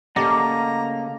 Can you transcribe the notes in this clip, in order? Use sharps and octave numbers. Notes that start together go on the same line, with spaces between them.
C#3 A3 A#3 G4 D5 D#5 F#5 A#5